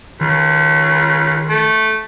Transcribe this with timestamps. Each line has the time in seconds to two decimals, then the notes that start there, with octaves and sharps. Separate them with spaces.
0.21 C#2 D#3
1.49 A3